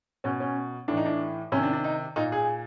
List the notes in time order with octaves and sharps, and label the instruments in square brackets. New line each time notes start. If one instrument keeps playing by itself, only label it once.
[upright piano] B2 C#4
C#4
A2 E3 D4
D#4
D4
C3 C#4
D#3
D4
D4
D#4
A#2 D#4
G#4